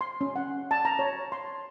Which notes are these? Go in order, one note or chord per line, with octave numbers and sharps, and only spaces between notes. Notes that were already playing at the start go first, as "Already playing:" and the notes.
C6
C#4
F#5
A5
A#5
C#5
C6